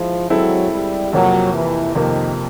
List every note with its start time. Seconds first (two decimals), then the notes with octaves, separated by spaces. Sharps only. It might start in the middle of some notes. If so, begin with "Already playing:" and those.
Already playing: F3 G#3 E4
0.30 F#3 G#3 C4 E4 A4
0.72 G3
1.13 F2 C3 F3 F#3 A#3
1.54 E3
1.95 F2 C3 D#3 F3 A#3